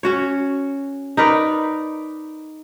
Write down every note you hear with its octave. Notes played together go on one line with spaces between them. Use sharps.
C#4 F#4 C#5
D#4 A#4 B4 D5